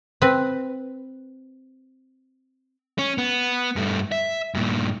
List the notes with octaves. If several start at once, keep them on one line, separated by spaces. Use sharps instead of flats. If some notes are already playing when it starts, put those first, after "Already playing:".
C4 B4
C#4
B3
G2 A3
E5
G2 A#2